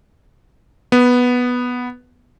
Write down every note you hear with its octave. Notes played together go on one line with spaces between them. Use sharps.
B3